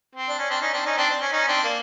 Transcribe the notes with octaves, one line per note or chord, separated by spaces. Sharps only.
C4
D4
C#4
C4 D4
C#4 D#4
C4 D4
C#4 D#4
C4 D4
C4
C#4
C#4 D#4
C4 D4
A#3